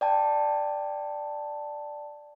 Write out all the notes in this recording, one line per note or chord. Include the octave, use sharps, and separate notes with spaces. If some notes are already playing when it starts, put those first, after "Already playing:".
D5 G5 A5